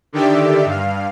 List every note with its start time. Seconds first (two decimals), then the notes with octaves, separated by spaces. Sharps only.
0.13 D3 D#3 G4 D5 E5
0.65 G2 F5